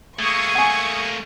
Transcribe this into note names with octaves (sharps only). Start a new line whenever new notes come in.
A3 A#3 G#4 C#6 D#6
F#5 G#5